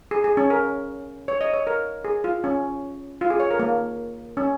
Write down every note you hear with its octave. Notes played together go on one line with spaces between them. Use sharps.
G#4
G#4
C#4
A#4
C#5
D#5
C#5
A#4
G#4
F4
C#4
F4
G#4
C#5
A#4
A#3
C#4